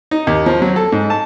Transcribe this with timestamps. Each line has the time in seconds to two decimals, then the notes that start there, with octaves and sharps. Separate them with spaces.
0.11 D#4
0.27 D#2
0.46 F3
0.62 F#3
0.76 A4
0.92 G#2
1.10 A5